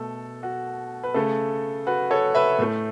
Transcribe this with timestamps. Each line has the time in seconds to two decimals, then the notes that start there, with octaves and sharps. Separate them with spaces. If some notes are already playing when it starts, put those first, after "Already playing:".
Already playing: B2 A3 A4
0.43 F#4
1.04 B4
1.14 C#3 A3 A4
1.87 F#4 B4
2.11 A4 C#5
2.35 B4 E5
2.59 A2 A3